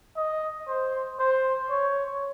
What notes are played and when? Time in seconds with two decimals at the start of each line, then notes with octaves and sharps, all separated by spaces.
0.17 D#5
0.68 C5
1.19 C5
1.70 C#5